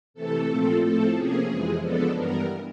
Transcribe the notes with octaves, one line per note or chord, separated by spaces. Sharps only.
C3 E3 A3 A4
A#2 F3 A3 C4
A2 F3 A3 C4 A4
C3 F3 A#3 C#4 G#4
F2 C3 E3 G#3
C#3 F3 G#3 B3 D4 A4
G2 E3 G3 B3 A#4